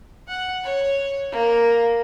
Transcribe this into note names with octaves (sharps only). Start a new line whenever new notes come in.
F#5
C#5
A#3